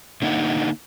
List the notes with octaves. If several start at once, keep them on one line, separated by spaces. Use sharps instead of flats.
D3 A#3 D#4 F#5